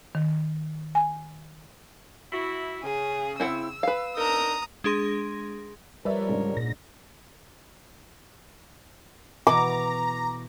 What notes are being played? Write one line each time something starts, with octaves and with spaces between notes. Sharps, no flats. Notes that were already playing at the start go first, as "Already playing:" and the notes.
D#3
G#5
E4 F#4
C#3 G#4
C4 E4 F#5 E6
B4 F5
D4 D#4 A#4 A#5 D#6
G#3 D4 G#4 C6 A#6
F3 G3 A#4 B4 C#5 D5 E5
G#2 C#3 D4
A#2 A#6
B2 E3 A#5 D6